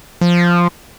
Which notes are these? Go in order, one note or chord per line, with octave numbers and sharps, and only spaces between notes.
F3